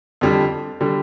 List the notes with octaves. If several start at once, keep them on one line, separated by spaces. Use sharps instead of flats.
F2 D3 G3
D3 G3